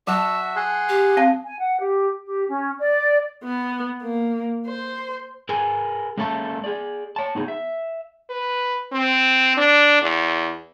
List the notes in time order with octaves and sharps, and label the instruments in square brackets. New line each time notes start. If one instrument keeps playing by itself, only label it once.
[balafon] F#3 [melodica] F#4 E5 [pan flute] A5
[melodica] G#4 F#5 C6
[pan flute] G4
[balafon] C4 F5 A5
[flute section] G#5
F#5
G4
G4
C#4
D5
[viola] B3
A#3
C5
[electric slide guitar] G#4 A#4 B4 G#5
G#3 A#3 C#4 A4 E5 A5
G#4 D5
C#5 A5
B3 D#4 G#4
E5
[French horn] B4
C4
D4
E2